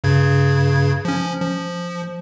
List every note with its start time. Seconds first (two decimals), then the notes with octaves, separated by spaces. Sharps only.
0.04 G2 C#3 G#6
1.05 F3 C#4
1.41 F3